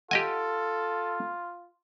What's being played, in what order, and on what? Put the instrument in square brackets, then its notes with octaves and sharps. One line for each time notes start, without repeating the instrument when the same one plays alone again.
[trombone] F4 [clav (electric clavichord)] G4 D#5 G#5 [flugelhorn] A4 [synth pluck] F#5